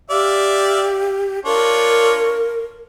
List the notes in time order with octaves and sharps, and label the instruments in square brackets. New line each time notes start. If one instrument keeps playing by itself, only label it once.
[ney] G4 [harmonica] D5 E5 F5
[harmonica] D4 F4 C#5 [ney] A#4